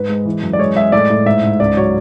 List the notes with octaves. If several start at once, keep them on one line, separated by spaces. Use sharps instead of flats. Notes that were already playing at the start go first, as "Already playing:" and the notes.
Already playing: G#2 B4
G#3
E3
F#2
D5
G#3 C#5
G#3 E5
A2 D5
A2
G#2 E5
G#2
C#2 D5
F#3 C#5